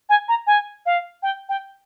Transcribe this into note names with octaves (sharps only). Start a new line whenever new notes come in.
G#5
A#5
G#5
F5
G5
G5